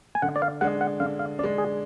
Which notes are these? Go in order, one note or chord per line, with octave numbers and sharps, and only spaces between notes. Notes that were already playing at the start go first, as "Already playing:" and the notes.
G#5
D3 F#5
D5
F5
G#3 D4 F#5
F#5
D3 F5
F5
G#3 D4 D5
G#4